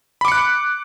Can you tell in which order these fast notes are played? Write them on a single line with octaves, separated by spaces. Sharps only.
B5 D6 C#7 F#6